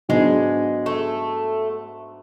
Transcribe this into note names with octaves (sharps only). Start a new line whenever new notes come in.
G#2 F#3 G#3 B3 D4
A3